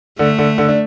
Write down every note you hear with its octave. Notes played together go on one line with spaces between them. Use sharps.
D3 A3
D3
D3
D4